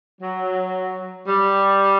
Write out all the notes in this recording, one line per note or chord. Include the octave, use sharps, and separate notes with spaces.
F#3
G3